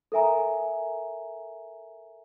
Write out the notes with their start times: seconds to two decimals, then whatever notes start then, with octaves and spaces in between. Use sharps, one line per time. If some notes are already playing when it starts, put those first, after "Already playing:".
0.12 A4 A#4 E5 G#5 A#5